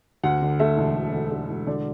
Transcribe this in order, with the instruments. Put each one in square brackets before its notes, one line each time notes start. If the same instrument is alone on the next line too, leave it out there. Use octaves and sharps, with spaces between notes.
[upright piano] D2 F#5
D3
A3 E5
E1
D2
D3
A3
E1
D3 D5